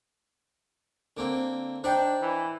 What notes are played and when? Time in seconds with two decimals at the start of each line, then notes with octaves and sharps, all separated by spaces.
1.17 D3 A#3 C4
1.84 D4 D#4 C5 D5 G5 B5 G6
2.22 E3